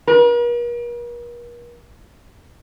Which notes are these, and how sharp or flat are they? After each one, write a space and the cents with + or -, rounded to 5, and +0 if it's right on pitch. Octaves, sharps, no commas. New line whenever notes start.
A#4 +45